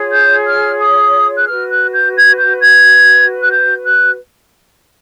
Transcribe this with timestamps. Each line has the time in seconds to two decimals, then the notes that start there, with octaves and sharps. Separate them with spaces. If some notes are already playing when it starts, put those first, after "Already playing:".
Already playing: F4 G#4 C#5
0.12 G6
0.46 F6
0.80 D#6
1.37 F#6
1.48 F#4 B4 F6
1.70 F#6
1.92 G6
2.15 G#6
2.38 G6
2.61 G#6
3.41 F#6
3.51 G6
3.84 F#6